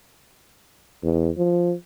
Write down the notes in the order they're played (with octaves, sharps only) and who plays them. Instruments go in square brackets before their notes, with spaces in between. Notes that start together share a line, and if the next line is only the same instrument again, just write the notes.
[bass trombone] E2
F3